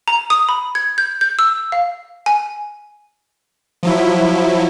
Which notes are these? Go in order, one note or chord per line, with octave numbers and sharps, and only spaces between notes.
A#5
D#6
B5
G#6
G6
G6
E6
F5
G#5
F3 F#3 E4